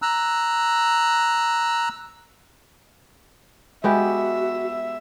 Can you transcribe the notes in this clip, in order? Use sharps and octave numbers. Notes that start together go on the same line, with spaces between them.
A#5 E6 F#6
G#3 B3 F#4 G4 E5